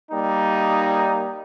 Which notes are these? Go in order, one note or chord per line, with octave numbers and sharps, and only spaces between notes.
G3 A#3 D#4